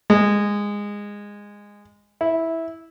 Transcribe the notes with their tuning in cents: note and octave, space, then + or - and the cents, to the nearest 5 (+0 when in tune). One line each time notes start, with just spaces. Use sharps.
G#3 -15
E4 -10